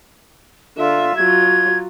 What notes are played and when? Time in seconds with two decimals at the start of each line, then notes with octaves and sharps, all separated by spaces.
0.78 D3 F4 E5
1.17 F#3 F4 G#6